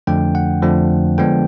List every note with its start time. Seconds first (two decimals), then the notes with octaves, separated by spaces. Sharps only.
0.07 F2 D3 F3 A3 D4 G5
0.35 F#5
0.62 F2 D3 F3 A3 D4
1.18 D3 F3 G#3 B3 D4 G5